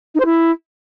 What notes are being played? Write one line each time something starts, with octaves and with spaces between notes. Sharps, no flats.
D#4
C5
E4